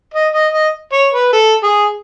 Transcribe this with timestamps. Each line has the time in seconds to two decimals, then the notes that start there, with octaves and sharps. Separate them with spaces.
0.14 D#5
0.34 D#5
0.53 D#5
0.93 C#5
1.14 B4
1.33 A4
1.63 G#4